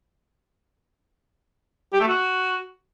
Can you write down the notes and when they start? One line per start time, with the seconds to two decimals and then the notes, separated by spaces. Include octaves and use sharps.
1.93 G4
2.00 A3
2.08 F#4